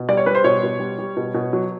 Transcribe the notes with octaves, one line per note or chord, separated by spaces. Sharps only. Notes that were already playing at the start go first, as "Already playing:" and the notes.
Already playing: B2
G3 D5
C#5
G3 B4
C5
B2 C#5
B2
G3
G3
B2
B2
F#3